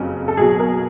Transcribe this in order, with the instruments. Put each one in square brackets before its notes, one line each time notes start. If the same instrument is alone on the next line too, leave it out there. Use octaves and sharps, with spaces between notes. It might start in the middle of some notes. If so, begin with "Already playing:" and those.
Already playing: [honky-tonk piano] F#1 F2 C#3 F#3
A4
B1 B2 F#3 G#4
A#4